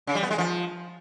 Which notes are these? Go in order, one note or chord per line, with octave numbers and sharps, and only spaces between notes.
C#3
G3
B3
G#3
F3